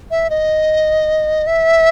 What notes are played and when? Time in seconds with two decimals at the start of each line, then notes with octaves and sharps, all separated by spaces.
0.11 E5
0.30 D#5
1.47 E5